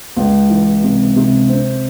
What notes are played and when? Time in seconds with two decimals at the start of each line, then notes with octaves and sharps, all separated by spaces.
0.17 C#2
0.49 E3
0.83 C3
1.16 C3
1.49 C4